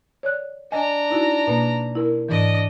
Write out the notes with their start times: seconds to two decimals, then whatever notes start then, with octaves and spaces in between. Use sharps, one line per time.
0.23 C#5 D5 F#6
0.72 D4 D#5 G#5 A#5
1.10 D#4 E4 F#4
1.47 B2 A#3
1.95 E4 A#4
2.29 G#2 E3 D4 D#5